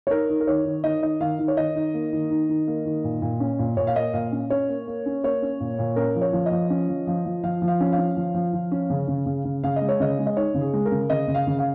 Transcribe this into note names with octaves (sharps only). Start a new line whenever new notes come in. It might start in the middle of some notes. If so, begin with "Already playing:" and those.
C#5
D#4 A#4
D#4
A#4
D#3 C#5
D#3
D#3 D#5
D#4 D#5
D#3 F5
D#3
C#5
D#3 D#5
D#4
A#3
D#3
D#4
D#3
A#3
D#3
A#2
A#2
C#4
A#2
A#2 C#5
F5
A#3 D#5
A#2 F5
C#4
C#4 C#5
A#3
A#3
C#4
A#3 C#5
C#4
A#2
A#2
C#4 A#4
F3
C#5
F3
D#5
F3
C#4
F3
F3
F3
F3 F5
F3
F5
C#4
F5
C#4
F3
F3
F3
C#4
C#3
C#3
C#3
C#3
C#3 F5
D#5
G#3
C#5
C#3 D#5
G#3
D#5
D#4 C#5
C#3
G#4
G#3
A#4
C#3
C#3 D#5
C#3
F5
C#3
F5